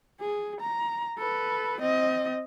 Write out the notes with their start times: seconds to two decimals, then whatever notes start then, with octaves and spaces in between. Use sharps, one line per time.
0.21 G#4
0.61 A#5
1.18 A4 B4
1.81 C4 D#5